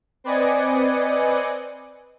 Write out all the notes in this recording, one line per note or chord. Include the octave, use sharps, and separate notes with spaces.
C4 B4 D5 D#5 G#5 C#7